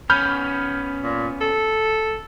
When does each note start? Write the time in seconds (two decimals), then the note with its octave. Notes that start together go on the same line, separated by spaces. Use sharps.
0.10 B3 C#4 B5 F6 G6
1.03 A#2
1.41 A4